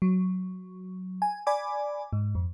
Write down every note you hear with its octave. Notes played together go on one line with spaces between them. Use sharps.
F#3
G#5
D5 G#5 B5 D6
G#2
F2